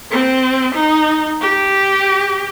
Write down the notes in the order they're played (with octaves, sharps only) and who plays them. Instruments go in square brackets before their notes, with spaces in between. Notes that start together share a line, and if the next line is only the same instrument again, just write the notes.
[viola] C4
D#4
G4